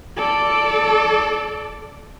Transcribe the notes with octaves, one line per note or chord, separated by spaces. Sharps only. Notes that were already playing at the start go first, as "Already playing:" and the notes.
A4 D5